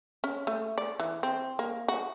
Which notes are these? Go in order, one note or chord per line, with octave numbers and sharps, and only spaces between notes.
C#4
A3
D5
E3
C4
A#3
F#4